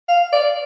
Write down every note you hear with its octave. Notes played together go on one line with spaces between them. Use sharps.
F5
D5